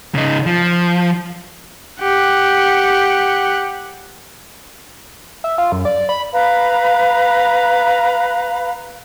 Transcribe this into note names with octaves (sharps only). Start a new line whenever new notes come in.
C#3 D#4
F3
G4 F#5
E5
F4
F#2
D5
B5
B4 F5 A#5 B5